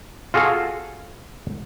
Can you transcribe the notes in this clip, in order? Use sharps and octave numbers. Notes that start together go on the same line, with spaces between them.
F4 F#4 G#4 A4 F5